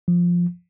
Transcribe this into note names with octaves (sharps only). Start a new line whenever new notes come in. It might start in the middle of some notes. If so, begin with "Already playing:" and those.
F3